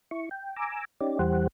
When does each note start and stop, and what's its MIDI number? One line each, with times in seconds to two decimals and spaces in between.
0.11 0.29 64
0.11 0.29 85
0.31 0.56 79
0.56 0.85 80
0.56 0.85 82
0.56 0.85 86
0.56 0.85 88
1.01 1.19 61
1.01 1.19 63
1.01 1.19 67
1.01 1.19 74
1.19 1.47 40
1.19 1.47 52
1.19 1.47 55
1.19 1.47 67
1.19 1.47 72
1.19 1.47 78